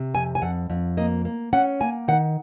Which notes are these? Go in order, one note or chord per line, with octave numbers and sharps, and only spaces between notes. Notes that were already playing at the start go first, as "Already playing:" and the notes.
Already playing: C3
F2 G#5
G#5
F2 F#5
F2
A#3 D#5
A#3
C#4 F#5
A#3 G#5
D#3 F#5